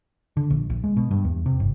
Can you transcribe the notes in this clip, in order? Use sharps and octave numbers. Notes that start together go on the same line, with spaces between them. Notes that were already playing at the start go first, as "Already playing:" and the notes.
D3
A#1
A#1
G#3
B2
G2
E2
C3
G1